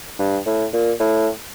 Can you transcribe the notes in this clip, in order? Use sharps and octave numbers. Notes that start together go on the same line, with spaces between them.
G2
A2
A#2
A2